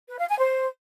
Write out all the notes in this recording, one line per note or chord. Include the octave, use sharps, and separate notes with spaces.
B4
F5
G#5
C5